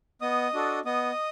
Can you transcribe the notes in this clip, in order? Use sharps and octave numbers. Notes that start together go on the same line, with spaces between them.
B3 D#5 D#6
D4 F#4 A4
B3 D#5 D#6